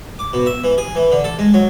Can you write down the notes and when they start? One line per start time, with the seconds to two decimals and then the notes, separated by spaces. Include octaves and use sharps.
0.19 D6
0.33 B2
0.46 E5
0.64 E3
0.78 G#4
0.95 E3
1.12 D3
1.24 A4
1.39 G#3
1.54 F#3